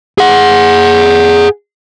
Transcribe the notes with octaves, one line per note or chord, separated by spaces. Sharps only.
G#4 F#5